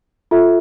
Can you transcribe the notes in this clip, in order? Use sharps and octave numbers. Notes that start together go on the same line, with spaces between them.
F4 A4 E5